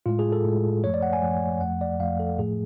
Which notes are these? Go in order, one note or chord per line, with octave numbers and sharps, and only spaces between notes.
A2 G#3 F4
G#4
A4
A2 G#3
F#2 F3 A3 C#5
D5
F#5
G#5
F#2 F3 A3
F2 F3 A3 F#5
D5
F2 F3 A3 F5
A4
A2 F3 A3 G#4